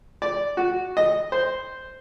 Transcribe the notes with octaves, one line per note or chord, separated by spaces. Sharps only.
D5
F#4
D#5
C5